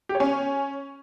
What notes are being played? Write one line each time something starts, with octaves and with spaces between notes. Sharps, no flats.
G4
C#5
C#4